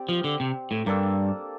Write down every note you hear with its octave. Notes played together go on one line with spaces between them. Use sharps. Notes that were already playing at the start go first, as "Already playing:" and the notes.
Already playing: C4 G4 D5
F3
D3
C3
A2
G2 A#3 D4 A4